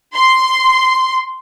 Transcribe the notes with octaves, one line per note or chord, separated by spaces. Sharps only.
C6